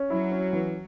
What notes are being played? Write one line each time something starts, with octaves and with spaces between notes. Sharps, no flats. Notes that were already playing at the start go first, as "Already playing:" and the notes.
Already playing: C#4
F#3 E4
C#4
E3